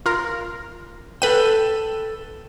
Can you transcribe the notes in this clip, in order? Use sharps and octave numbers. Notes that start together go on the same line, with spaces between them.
F4 A#4
A4 B4 G5 D#7